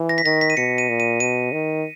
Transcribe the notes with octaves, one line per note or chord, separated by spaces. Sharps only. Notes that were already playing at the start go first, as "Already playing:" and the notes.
Already playing: E3
A#6
B6
D#3 A#6
B6
D#7
B2 C#7
D#7
A#2
D#7
B2 D#7
D#3